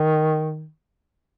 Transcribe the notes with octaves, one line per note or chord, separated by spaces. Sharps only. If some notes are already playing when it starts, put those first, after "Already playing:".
Already playing: D#3